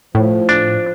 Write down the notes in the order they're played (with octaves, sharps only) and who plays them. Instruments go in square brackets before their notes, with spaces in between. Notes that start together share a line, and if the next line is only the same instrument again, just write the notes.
[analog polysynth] A2 [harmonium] F3
[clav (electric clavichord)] D4